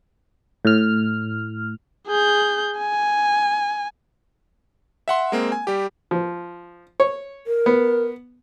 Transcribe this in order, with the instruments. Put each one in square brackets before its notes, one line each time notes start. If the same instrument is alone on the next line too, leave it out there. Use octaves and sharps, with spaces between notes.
[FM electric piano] A2 F6
[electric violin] G#4 G6
G#5
[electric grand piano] E5 F#5 C6
G#3 A#3 C4
G#5
G3 G4
[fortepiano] F3
C#5
[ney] A#4
[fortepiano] B3